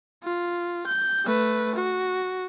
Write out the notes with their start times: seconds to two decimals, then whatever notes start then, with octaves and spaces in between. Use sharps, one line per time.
0.24 F4
0.86 G6
1.25 A3 B4
1.75 F#4